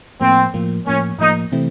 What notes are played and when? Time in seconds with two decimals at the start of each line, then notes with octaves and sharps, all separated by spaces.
0.21 A2 F3 A#3 C4
0.54 A2 F3 A#3
0.86 A2 F3 A#3 C#4
1.19 A2 F3 A#3 D#4
1.52 C3 E3 A3 C4 E4